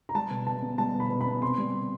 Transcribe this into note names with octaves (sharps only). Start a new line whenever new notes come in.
A#5
G3 A5
B2
B2 A5
B3
G3 A5
B2
B5
B2
B5
B3
C3 C6
G3